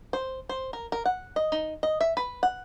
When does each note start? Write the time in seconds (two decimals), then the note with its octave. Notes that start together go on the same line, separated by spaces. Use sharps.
0.13 C5
0.49 C5
0.73 A#4
0.92 A#4
1.05 F#5
1.36 D#5
1.52 D#4
1.83 D#5
2.01 E5
2.17 B4
2.43 F#5